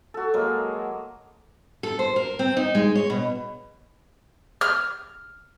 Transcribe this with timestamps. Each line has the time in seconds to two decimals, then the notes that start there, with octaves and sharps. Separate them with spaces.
0.14 F#4 A4
0.34 F#3 G#3 A#3
1.83 A4
1.99 C5
2.16 A#4
2.39 C4
2.57 D#4
2.75 G#3
2.95 C#5
3.10 B2
4.61 F6